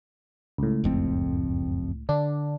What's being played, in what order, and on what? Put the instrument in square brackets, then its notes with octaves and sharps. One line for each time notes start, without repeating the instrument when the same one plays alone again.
[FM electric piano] C#2 A2
[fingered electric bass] F#1 F2 C4
[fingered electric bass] D3 [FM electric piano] D4